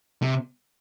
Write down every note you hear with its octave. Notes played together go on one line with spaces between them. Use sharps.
C3